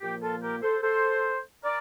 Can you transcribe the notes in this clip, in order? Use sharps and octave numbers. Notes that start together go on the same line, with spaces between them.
A#2 F3 A#3 G4
F4 A4
G4 A#4
A4 C5
A4 C5
A#4 D5